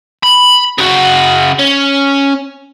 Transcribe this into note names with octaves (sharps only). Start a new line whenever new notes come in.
B5
C#3 F#4
C#4